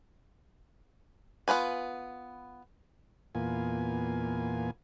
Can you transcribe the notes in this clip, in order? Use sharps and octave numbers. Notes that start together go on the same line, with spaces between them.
B3 F4 B4 G#5
E2 A#2 A#3 B3 F4 G#5